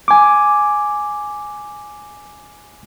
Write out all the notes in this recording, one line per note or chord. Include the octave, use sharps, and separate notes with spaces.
G#5 D6